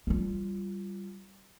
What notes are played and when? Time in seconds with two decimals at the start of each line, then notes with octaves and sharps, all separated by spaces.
0.07 G3 F4